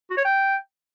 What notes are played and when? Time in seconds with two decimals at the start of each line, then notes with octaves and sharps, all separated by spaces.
0.10 F#4
0.17 C#5
0.24 G5